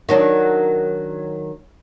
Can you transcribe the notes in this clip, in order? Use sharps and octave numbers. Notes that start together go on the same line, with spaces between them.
D#3 F#3 D4